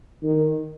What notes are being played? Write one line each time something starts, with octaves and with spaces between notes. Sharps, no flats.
D#3